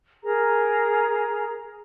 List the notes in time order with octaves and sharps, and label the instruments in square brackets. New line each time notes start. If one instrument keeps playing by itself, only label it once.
[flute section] G#4 A#4 A#5